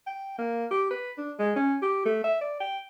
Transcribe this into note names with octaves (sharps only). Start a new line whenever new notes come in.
G5
A#3
G4
B4
D4
G#3
C#4
G4
A3
E5
D5
G5